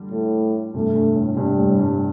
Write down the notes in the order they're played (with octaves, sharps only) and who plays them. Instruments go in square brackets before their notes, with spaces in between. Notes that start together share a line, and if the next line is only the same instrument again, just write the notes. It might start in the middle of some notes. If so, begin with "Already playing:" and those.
Already playing: [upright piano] D3 G3
[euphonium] A2
[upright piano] G2 C3 [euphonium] A3
[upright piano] G2
A2
[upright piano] G2 C3 [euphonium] G3
[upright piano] A2
G2